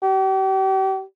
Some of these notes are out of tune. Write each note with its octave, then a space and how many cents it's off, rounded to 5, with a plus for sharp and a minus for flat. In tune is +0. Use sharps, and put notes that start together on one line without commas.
G4 -40